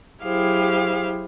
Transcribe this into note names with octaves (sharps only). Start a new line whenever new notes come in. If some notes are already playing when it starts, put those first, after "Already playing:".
F#3 E4 G4 G#4 C5 F5